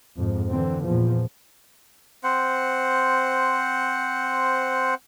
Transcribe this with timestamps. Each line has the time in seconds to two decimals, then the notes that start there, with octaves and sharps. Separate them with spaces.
0.17 F2 G#2
0.50 D3 E3 C4
0.84 E2 A#2 F3
2.24 C4 C5 F#5